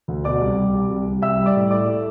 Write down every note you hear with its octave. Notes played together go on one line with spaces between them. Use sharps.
D2
B2 D5 D6
C2
G3
C2
C2
C2
G3 E5 E6
G3
D5 D6
A2
A3 D5 D6
A3